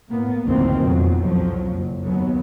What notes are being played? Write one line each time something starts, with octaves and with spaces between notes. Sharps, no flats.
A2 A#3 B3
F#1 D2 A#2 D#3 E3 C4
F2 B2 F#3
C2 F2 F3 F#3
F#1
D#2 F#3 B3